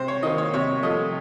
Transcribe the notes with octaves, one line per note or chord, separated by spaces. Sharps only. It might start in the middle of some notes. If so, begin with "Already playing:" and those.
Already playing: C3 C5
C#5
D#3 A#3 D#4 D#5
C#5
C3 C#5
F3 A3 D#5